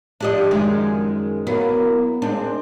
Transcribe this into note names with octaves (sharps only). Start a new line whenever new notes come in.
F3 D4 G4 D5 D#5
F#2 D#3 G#3
F#3 A#3 B3 E4
D#2 G#3 C4 D4